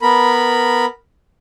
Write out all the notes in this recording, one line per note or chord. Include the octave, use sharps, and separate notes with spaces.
B3 A#4 B5